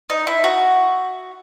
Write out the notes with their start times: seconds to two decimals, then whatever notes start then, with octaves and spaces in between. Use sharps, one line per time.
0.10 D#4
0.27 E4
0.44 F#4